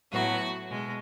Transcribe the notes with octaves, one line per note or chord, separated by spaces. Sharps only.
A2 F#3 B3 F#4
B2 G#3